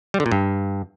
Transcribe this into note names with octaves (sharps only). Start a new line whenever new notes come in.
G3
D3
A#2
G2